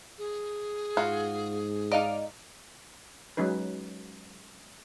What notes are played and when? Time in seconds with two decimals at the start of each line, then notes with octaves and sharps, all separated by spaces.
0.18 G#4
0.97 G#2 F4 F#4
1.92 D#4 D5 D#5 F5
3.37 F#3 G#3 C#4 D#4 B4